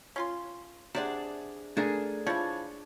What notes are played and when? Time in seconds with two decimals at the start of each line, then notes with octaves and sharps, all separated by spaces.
0.16 C#4 F4 C6
0.95 C3 D4 G#4 D5 F#5
1.77 A3 D4 G#4 A#4
2.27 F3 D4 E4 C#5